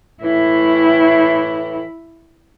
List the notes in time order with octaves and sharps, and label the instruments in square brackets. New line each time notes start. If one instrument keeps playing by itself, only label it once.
[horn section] A2 E3 [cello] E4